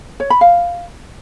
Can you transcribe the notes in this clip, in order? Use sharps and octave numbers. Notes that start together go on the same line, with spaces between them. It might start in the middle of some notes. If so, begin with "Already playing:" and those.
C#5
B5
F5